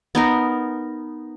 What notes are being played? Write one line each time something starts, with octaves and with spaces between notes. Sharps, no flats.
B3 D#4 A#4